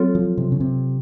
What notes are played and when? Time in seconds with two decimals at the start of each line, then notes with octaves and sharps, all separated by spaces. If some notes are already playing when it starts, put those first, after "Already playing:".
Already playing: F#3 C4 F4 A4 C#5
0.15 F3
0.38 C3
0.52 C#3
0.60 C3